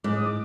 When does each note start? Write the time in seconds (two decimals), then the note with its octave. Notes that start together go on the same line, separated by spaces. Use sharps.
0.04 G#2 D6
0.15 D#6
0.26 D6